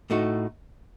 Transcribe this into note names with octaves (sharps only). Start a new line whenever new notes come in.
A2 A3 D#4 F#4